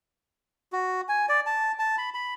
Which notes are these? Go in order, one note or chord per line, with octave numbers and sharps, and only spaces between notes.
F#4
G#5
D5
A5
A5
B5
B5